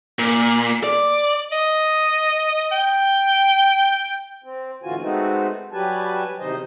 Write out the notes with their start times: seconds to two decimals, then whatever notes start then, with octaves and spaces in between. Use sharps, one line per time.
0.19 A#2
0.84 D5
1.52 D#5
2.72 G5
4.44 C4
4.83 A2 D3 E3 F4 F#4 G#5
5.01 G#3 A3 B3 C4 D#4 F#4
5.72 F#3 G3 G4 B4 G#5 A5
6.39 E2 C3 D#3 D#4 C5 D#5